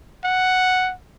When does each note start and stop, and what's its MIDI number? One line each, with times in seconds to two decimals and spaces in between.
0.24 0.92 78